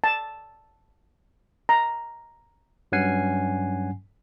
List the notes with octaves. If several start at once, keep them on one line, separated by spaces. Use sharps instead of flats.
A5
A#5
G2 F#3 C#4 F#5 G#5 C7